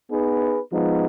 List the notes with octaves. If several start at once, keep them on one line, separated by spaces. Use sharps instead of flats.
B3 D#4 G#4 B4
F3 G#3 B3 D#4